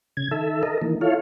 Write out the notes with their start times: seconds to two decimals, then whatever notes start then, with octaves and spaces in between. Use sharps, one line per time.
0.17 C#3 G#6
0.31 D#3 A4 E5
0.63 A4 A#4 D#5
0.82 D#3 E3 A#3
1.01 E4 F4 A4 C#5 F5